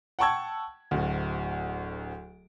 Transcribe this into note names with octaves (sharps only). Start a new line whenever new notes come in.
F#5 G5 A5 C#6 E6 G#6
D1 D2